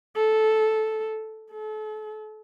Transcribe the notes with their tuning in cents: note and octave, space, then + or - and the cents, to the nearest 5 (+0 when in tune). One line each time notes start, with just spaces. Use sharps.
A4 -10
A4 -35